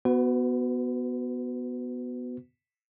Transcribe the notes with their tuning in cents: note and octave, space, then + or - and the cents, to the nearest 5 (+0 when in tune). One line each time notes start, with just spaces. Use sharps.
B3 +0 F#4 +0 B4 +40